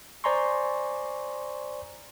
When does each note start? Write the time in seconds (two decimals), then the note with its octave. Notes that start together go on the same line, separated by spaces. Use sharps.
0.24 C5 D5 G#5 A#5 C6 C#6